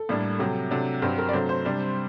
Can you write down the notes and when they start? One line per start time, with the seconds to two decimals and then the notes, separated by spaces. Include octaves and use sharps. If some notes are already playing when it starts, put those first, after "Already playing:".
Already playing: A4
0.09 A2 G3 A#3 D4
0.39 C3 F#3 A3 G4
0.70 C3 F#3 A3 D4
1.02 G2 F#3 C4 G4
1.18 A#4
1.29 D5
1.33 C3 F#3 A3 D4 C5
1.49 C5
1.65 C3 G3 D4